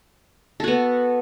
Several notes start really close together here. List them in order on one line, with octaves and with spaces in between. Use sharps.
A4 F#4 B3